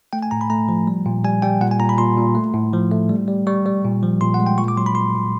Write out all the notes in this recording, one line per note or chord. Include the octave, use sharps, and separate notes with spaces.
A3 G5
G#5
A2 A#5
B5
A3 A#5
F3
G3
A#2
G3 G#5
G3 G5
A#2 F#5
G#5
A#2 A#5
B5
A#2 C6
A#2
A3
A2
F3
A3
G3
G3
G3 C#6
G3
A#2
F3
A#2 C6
F#5
G#3
G5
A#2 C#6
D6
F#3 C6
B5
A#2 C6
A#2